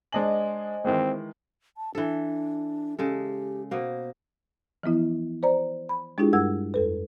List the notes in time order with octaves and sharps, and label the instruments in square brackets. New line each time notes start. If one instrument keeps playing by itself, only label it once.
[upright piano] G#3 D4 F#7 [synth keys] C5 D#5 G#5
[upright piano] D#3 E3 G#3 [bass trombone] C4
[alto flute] A5
[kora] E3 A4 [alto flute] D4
[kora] C#3 G#3 A4 [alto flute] G4
[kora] B2 A#3 [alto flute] C5
[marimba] E3 F3 B3 E4
C5 D5 A#5
B5
G#3 D4 E4 F4 G4 G#4
G2 G3 A#4 F#5 E6 G#6
F2 A4 B4